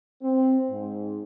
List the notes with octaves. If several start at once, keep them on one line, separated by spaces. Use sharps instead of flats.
C4
G#2